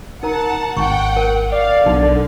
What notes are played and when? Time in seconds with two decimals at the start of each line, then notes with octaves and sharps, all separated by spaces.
0.23 D#4 A#4 F#5 A5 A#5
0.77 G#1 F#5 G5 C#6
1.16 A#4
1.52 D5 F5
1.86 B1 D3 D#4